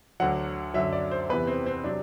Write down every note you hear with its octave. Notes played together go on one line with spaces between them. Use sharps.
D2 D3 F#3 F#5
F#2 D3 F#3 E5
D5
C5
E2 C3 E3 B4
C4
C4
C3 F#3 D4